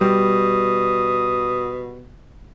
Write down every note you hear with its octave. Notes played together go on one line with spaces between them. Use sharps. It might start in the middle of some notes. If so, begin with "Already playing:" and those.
B2 G3 D#6